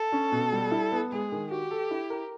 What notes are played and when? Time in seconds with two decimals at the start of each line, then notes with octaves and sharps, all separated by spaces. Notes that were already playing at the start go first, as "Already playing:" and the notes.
Already playing: A4
0.12 C#4
0.32 B2
0.52 G3
0.72 E4
0.92 B3
1.12 G#3 G#4
1.32 D#3
1.51 F#4 G4
1.71 A4
1.91 E4
2.10 A#4